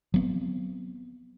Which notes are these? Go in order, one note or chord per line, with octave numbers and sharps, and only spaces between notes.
F#3 B3 C4